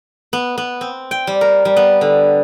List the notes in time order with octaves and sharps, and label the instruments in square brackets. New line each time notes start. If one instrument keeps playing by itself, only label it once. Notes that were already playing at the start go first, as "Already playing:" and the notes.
[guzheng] B3
B3
C4
G5
G3
A#4
G3
B3
D3